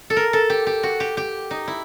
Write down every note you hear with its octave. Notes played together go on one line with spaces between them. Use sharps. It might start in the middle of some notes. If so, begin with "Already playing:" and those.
A4
A#4
A4
G4
G4
F#4
G4
G4
D#4
E4